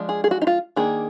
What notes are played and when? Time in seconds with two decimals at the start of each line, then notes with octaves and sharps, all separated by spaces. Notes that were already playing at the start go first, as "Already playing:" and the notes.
Already playing: F3 G#3 D4
0.09 G#4
0.24 G#4
0.31 F#4
0.42 D#4
0.47 F4
0.76 D#3 A#3 D4 G#4